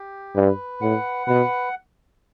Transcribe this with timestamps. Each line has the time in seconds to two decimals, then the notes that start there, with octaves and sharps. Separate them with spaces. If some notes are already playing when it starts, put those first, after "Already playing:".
Already playing: G4
0.36 G2 B4
0.81 A2 F#5
1.27 B2 B4